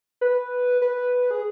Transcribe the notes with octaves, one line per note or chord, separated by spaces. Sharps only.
B4
B4
G#4